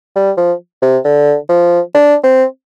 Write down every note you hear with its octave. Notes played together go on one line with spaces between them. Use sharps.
G3
F3
C3
D3
F3
D4
C4